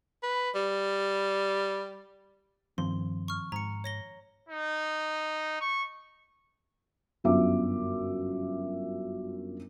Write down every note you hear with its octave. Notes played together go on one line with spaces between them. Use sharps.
B4
G3
G2 D#3 F3 C4 C6
C#6 F6
G#2 A#5 C#7
C#5 A#6 G7
D#4
C#6
G1 F#2 F4 E5 D6